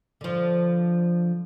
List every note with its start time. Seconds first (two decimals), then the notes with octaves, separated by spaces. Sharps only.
0.21 D3 F3